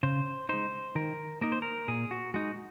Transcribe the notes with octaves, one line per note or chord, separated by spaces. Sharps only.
C#3 C5
G#3 D#4 C5
D#3 A#4
A#3 D#4 A#4
C5
A#4
A#2 G#4
F#4
G#3 D#4 F#4